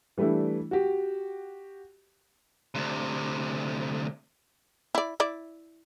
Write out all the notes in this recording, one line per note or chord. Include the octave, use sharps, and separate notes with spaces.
E3 G3 A3 D4 E4
F#4 G4
D2 C3
E4 D5
E4 D5